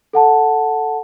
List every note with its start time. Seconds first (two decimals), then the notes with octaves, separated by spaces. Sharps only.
0.13 A4 F#5 A5